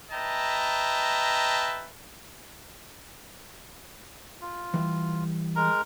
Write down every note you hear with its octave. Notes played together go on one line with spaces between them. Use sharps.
B4 D#5 E5 G5 A5 A#5
F4
E3 G3 E5
G#3 A#4 A#5